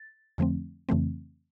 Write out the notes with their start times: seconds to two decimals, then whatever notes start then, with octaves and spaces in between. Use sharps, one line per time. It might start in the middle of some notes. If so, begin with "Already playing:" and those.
Already playing: A6
0.38 F2 D3 F3 A3 C4
0.89 F2 C#3 E3 A3 C4